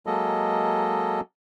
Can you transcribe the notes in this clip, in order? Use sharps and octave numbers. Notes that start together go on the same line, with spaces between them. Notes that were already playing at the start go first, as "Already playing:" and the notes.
F#3 G#3 A#3 A4 D#5